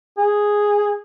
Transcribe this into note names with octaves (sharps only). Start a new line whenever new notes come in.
G#4